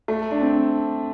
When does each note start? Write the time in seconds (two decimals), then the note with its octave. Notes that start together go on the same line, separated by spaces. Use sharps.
0.08 A3
0.31 D4
0.41 C4